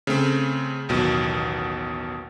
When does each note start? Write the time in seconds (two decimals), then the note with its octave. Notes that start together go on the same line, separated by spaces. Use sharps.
0.07 C#3 A3 C4
0.89 A1 D#2 B2 F#3